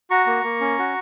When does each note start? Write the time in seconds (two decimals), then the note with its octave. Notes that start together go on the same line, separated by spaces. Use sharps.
0.10 F#4 A#5 C#6
0.27 A#3
0.44 A#3
0.61 C#4
0.79 F#4